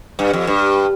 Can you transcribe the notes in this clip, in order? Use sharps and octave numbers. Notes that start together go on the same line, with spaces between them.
G2
F2
G2